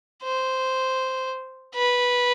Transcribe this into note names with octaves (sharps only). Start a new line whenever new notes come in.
C5
B4